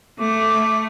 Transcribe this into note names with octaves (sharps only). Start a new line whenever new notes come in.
A3 D6